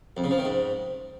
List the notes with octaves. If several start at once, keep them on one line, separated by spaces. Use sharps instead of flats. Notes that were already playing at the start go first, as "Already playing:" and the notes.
F2
C#3
F3
D#3
G#2